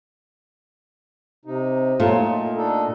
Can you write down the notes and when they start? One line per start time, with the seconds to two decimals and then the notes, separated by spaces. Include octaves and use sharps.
1.45 C3 D#4
2.00 A#2 F#3 A3 F4
2.15 D#4
2.57 D4 D#4 A4